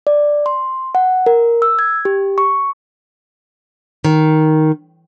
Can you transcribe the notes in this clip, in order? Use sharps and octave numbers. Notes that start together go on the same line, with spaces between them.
D5
C6
F#5
A#4
E6
G#6
G4
C#6
D#3